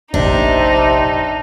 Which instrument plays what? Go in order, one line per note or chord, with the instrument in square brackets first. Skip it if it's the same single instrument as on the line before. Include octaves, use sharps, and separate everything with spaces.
[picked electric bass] F1 A#1 [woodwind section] C3 [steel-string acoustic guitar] D4 [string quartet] D#4